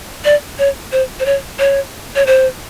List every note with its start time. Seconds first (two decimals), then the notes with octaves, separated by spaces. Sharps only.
0.25 D5
0.59 C#5
0.92 C5
1.20 C5
1.26 C#5
1.59 C#5
2.16 C#5
2.26 C5